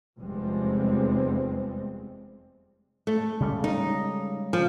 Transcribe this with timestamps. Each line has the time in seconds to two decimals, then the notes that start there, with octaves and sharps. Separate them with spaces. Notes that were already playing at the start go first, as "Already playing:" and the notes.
0.18 F1 E2 F3 G3 G#3 C4
3.07 A3
3.40 C#3 G3 G#3
3.64 D#4
4.53 F3